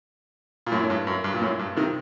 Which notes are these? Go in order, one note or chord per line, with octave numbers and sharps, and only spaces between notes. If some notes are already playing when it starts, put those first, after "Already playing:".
A#2
F#2 A2
A2
G2
F#2
G2
A#2
F#2 A2
G2
C3 D#3